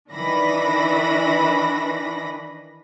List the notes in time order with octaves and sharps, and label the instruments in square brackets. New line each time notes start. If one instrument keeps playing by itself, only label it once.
[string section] D#3 E3 D4 B5 A#6